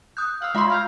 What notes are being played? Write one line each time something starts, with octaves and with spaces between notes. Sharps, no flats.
D#6 F#6 G6
F5 F#5 E6
G#3 F4 E5 B5 C6
E4 F5 A#5 G6